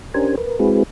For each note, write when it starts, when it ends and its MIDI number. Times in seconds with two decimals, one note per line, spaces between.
0.14 0.35 61
0.14 0.35 62
0.14 0.35 67
0.14 0.35 70
0.14 0.35 72
0.14 0.35 80
0.38 0.59 70
0.38 0.59 71
0.59 0.83 56
0.59 0.83 60
0.59 0.83 64
0.59 0.83 66
0.59 0.83 68
0.59 0.83 71